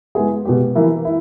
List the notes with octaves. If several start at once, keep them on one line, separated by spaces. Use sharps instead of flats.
G#3 B3 E4 G#4
B2 G#3 B3 G4
E3 A#3 E4
E4